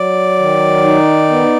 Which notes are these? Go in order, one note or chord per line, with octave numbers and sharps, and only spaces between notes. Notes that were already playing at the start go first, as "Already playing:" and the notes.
Already playing: F#3 D5
D#3
D#4
B3